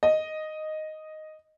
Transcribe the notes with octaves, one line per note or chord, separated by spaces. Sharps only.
D#5